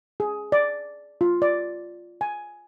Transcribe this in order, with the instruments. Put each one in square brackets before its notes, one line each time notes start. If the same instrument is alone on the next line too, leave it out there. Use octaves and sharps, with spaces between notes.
[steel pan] G#4
D5
F4
D5
G#5